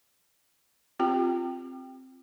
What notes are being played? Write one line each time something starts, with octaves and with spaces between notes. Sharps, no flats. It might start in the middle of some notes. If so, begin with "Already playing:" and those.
C4 F4 G4 G5